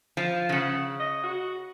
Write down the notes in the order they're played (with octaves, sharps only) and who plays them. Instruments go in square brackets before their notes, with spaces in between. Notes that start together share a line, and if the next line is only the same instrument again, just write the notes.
[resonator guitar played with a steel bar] F3 [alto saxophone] F5
[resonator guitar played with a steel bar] D#3
[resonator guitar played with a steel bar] C#3 [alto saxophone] F#5
[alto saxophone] D#5
F#4